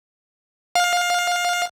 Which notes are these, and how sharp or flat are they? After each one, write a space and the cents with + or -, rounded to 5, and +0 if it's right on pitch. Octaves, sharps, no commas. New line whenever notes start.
F5 +20